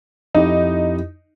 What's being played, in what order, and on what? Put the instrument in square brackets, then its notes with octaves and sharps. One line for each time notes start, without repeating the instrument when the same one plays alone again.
[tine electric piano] F2 E4 G4 [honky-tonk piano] D#4